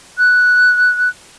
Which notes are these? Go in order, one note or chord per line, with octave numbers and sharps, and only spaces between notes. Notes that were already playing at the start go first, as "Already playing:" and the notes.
F#6